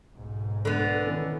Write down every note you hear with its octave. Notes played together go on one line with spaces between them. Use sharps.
B1 G#2
D3 B3
D#3 E3 C#4